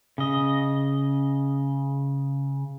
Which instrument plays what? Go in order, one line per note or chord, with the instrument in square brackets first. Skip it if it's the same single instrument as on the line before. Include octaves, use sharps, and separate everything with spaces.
[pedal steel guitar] C#3 D#5